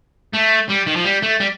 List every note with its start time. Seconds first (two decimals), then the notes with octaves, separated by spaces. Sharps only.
0.34 A3
0.70 G3
0.88 D#3
0.96 F3
1.05 G3
1.23 A3
1.40 G3